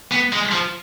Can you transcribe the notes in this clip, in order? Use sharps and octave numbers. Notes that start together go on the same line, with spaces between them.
B3
G#3
F3